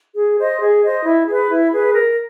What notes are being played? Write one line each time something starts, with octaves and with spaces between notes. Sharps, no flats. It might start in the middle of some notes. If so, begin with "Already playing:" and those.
G#4
C5 D#5
G#4
C5 D#5
E4
G#4 B4
E4
G#4 B4
A#4